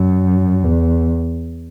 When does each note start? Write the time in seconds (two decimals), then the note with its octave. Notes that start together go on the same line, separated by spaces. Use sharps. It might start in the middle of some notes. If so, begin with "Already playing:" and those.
Already playing: F#2
0.64 E2